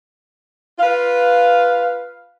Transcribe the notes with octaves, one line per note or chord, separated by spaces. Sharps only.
F4 B4 F5